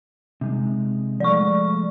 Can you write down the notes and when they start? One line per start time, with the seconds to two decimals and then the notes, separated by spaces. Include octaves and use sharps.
0.41 C3 G#3 D#4
1.20 F3 G#3 A3 D5 C#6